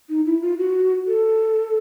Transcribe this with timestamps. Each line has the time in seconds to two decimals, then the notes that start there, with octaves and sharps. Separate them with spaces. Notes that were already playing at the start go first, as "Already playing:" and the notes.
0.10 D#4
0.26 E4
0.42 F4
0.58 F#4
1.07 A4